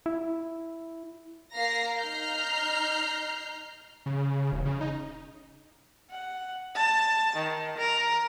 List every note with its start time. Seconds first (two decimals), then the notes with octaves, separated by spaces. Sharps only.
0.06 E4
1.53 A#3 F5 A#5 A#6 C7
1.98 D#4 A#5 F6 G6 C7
4.06 C#3
4.52 E1
4.65 C#3
4.81 D#4
6.10 F#5
6.75 A5
7.35 D#3
7.78 A#4